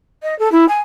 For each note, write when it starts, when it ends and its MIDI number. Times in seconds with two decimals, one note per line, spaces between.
0.23 0.37 75
0.39 0.51 69
0.52 0.65 64
0.68 0.80 80